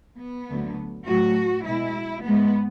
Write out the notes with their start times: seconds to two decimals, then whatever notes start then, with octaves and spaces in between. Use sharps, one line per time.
0.19 B3
0.48 D2 D3 F#3 A3
1.07 A2 F#3 A3 F#4
1.65 B2 G#3 E4
2.25 G#2 G#3 B3